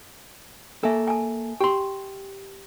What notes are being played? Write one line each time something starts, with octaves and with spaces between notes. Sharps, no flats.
A#3 A4 E5 G#5
G#5 A5
G4 G5 C6